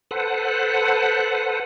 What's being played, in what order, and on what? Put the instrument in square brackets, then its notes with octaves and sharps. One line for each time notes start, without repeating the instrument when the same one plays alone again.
[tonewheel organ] A4 B4 C5 F#5